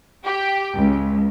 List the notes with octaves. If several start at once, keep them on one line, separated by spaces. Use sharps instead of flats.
G4
C#2